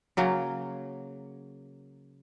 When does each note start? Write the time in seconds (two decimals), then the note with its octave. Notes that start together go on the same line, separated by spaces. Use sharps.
0.17 C#3 F#3 A#3